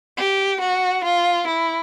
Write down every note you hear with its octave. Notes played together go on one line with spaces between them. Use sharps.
G4
F#4
F4
E4